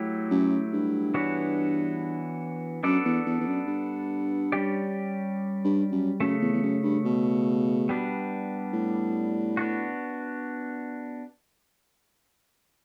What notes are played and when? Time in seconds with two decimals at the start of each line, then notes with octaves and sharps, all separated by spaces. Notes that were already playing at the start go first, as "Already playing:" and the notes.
Already playing: F#3 A3 E4 G4
0.31 F#2
0.73 G2
1.14 E3 B3 D4 F#4 C#5
2.83 F#2 B3 D4 A4 D5
3.05 E2
3.26 E2
3.40 E2
3.46 F#2
3.67 G2
4.52 G3 C#4 G4 D5
5.64 G2
5.92 F#2
6.20 F#2 C#3 F#3 A3
6.42 E2
6.53 E2
6.63 F#2
6.83 G2
7.05 B2
7.89 G3 B3 D4
8.73 A2
9.57 B3 D4 F#4